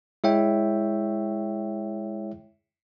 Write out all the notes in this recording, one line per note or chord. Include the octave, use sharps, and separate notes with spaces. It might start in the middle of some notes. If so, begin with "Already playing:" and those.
G#3 E4 C#5 E5 G5